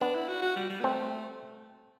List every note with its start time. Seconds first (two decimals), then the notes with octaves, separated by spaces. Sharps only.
0.01 B3 D4
0.15 E4
0.28 F#4
0.42 F#4
0.56 G3
0.70 G3
0.80 B3
0.84 A3 C4